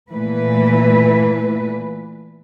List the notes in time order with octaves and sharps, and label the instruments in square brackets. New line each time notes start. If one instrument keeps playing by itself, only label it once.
[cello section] A#2 E3 A3 B4